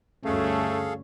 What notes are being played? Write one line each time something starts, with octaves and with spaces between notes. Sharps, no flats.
D2 G2 A3 C#4 G#4 A4 F5